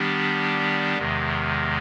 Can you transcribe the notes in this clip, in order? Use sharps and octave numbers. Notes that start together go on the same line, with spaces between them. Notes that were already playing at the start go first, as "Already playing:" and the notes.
Already playing: D#3 G3 B3 D4 G4
E2 C3 D#3 G#3